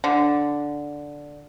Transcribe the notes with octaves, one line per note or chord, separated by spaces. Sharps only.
D3